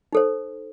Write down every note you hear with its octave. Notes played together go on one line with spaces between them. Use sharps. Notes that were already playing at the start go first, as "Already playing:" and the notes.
D#4 A4 C5